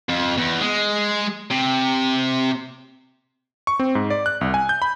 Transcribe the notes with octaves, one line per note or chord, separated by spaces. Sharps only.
F2
E2
G#3
C3
C#6
C4
G#2
D5
F#6
C2
G#5
G6
B5